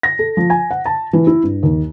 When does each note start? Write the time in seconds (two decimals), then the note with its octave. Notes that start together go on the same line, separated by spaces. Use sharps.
0.03 A#6
0.19 A4
0.37 F3
0.50 G#5
0.71 F#5
0.86 A5
1.13 E3
1.27 E4
1.43 G2
1.63 D#2